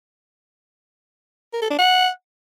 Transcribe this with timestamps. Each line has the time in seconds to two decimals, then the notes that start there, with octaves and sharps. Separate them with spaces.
1.53 A#4
1.62 A4
1.70 D4
1.78 F#5